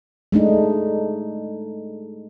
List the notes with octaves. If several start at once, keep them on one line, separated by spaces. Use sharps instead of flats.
G#3 A3 D4 D#4